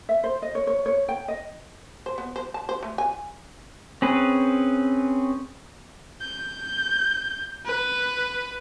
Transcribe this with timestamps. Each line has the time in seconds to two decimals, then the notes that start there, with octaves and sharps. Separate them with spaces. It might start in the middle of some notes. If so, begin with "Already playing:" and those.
0.09 E5
0.24 C5
0.42 D#5
0.55 C#5
0.67 C#5
0.86 C#5
1.08 G5
1.28 D#5
2.06 C5
2.18 B3
2.36 C5
2.54 A5
2.69 C5
2.83 A3
2.98 G#5
4.02 C4 C#4 G#4 B4
6.21 G6
7.66 B4